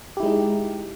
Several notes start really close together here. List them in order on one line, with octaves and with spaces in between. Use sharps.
G4 E4 G#3 D#4